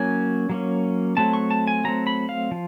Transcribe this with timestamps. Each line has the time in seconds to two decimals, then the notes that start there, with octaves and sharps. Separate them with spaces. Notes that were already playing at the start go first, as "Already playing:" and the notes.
Already playing: F#3 A#3 C#4 G#5
0.49 F#3 A#3 C#4
1.17 F#3 A3 C4 A5
1.34 C#6
1.51 A5
1.67 G#5
1.84 F#3 A3 C4 A#5
2.07 B5
2.29 F5
2.51 F3